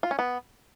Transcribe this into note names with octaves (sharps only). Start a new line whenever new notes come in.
F4
C#4
B3